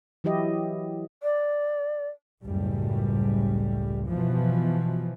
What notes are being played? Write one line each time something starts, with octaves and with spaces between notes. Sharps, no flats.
E3 F#3 E4 G4 D#5
D5
F#1 C#2 A2 G3
B2 E3 F3